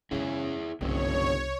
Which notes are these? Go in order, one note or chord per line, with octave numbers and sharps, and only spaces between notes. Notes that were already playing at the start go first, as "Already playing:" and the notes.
F#2 C#3 G#3 E4 G#4
F#1 C2 G2 D3 C4 C#5